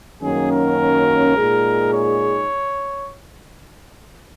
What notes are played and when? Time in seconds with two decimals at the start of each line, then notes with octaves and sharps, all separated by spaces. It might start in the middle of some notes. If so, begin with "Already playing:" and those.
0.23 F#2 D#3 F#3 A#3 C#4 G#4
0.52 A#4
1.36 A#2 G#3 D#4 G#4
1.93 C#5